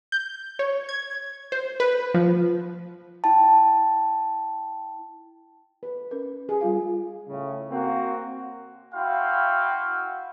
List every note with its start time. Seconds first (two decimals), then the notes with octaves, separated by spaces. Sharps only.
0.12 G6
0.59 C#5
0.89 G#6
1.52 C5
1.80 B4
2.14 F3
3.24 E4 G5 A5
5.83 B4
6.11 C#4 A#4
6.49 G#4
6.61 G3 F4 F5
7.28 A2 C#3
7.70 A#3 C4 F#4
8.95 E4 F#4 F5 G5 C6